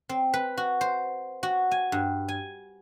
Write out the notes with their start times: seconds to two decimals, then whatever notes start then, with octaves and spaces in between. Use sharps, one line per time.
0.09 C4
0.34 B4
0.57 F#4
0.81 C5
1.43 F#4
1.71 G#5
1.92 G2
2.29 G#5